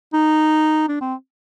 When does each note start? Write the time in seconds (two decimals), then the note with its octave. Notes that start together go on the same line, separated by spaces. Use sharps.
0.14 D#4
0.88 D4
1.01 C4